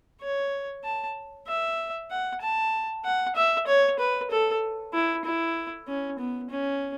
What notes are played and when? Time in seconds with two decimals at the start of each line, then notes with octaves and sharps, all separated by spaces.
0.21 C#5
0.84 A5
1.48 E5
2.11 F#5
2.42 A5
3.05 F#5
3.36 E5
3.67 C#5
3.99 B4
4.31 A4
4.93 E4
5.25 E4
5.88 C#4
6.19 B3
6.50 C#4